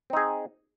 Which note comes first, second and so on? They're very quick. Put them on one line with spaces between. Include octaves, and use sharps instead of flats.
C4 D#4 G#4